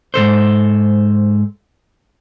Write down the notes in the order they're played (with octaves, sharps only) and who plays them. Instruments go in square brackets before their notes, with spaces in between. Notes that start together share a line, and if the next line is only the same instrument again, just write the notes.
[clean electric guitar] G#2 C3 A4 C5